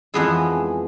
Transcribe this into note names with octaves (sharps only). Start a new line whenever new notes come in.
F2 E3 G#3 B3 E4